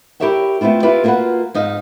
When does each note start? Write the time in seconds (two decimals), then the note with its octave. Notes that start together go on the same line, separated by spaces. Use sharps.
0.20 E4 G4 A#4 C#5 E5 F#5
0.61 A3 B3 C4 E4 F4
0.83 E4 F4 G4 B4 D5
1.04 A#3 B3 F4 F#4 B4 F#5
1.54 G#2 D#4 D#5 F5